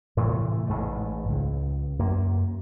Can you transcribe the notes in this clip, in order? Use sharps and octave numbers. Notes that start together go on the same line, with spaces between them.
A2 C3 E3 A3
A1 G#2 G#3 A3
C#2
F#2 A#3